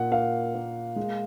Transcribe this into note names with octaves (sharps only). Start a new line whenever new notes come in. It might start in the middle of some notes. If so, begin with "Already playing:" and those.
Already playing: A#2 A#3 F#5
A#3 F5
A#3
G#3